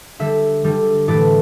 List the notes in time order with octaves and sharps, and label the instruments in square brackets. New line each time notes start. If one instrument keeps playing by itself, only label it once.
[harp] D3 G3 E5
D3 G3
A2 E3 A3 D5